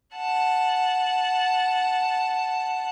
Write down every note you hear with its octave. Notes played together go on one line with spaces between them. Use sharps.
F#5 A5